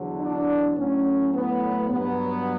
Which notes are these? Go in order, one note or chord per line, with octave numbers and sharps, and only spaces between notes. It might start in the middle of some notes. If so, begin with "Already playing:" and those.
Already playing: E2 D3 F#3
D4
A2 F#3 C#4
B3
G2 F#3 B3